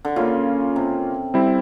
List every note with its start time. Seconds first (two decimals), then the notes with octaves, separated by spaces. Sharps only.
0.05 D3
0.16 C#3 A#3 C#4 F4
0.76 C3
1.34 G3 C4 E4